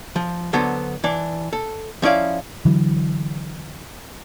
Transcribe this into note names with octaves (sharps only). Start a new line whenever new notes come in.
F3
D3 F#3 B3 D4 A4 C5
E3 D4 D5
A4
F3 C#4 E4 D5 F5
D3 E3 F#3